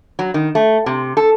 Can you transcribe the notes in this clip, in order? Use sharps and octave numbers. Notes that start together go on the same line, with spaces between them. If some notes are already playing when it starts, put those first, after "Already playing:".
F#3
D#3
A3
C3
A4